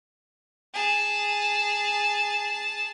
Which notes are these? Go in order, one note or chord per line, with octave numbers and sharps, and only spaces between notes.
G#4 A5